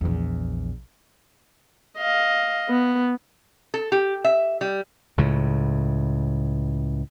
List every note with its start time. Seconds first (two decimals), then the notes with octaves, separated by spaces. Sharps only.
0.01 A#1 E2
1.98 D#5 F5
2.69 B3
3.74 A4
3.92 G4
4.24 E5
4.61 G3
5.18 C#2 A2 C#3